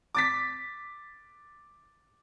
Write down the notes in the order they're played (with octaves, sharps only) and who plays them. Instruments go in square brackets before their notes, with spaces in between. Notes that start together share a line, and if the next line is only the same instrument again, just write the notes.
[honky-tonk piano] D6 A6 B6